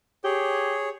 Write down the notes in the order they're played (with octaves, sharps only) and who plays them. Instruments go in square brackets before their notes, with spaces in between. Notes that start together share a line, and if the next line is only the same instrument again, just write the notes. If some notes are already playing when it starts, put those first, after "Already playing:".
[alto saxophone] G4 [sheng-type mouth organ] G#4 C#5